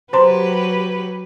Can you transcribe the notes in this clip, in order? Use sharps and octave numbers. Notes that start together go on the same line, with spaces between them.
F#3 G4 B4 C5 A#5 C6